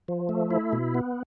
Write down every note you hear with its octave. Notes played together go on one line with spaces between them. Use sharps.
F3
A3
E4
B2
B3